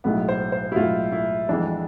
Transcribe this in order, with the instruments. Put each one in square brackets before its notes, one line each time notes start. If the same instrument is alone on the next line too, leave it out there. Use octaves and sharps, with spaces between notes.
[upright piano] B1 A2 G#3 B3
[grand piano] C5
C5
E4
[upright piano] B1 A2 G#3 B3 [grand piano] F4
[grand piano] E4
[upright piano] F2 E3 G#3 B3 [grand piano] D4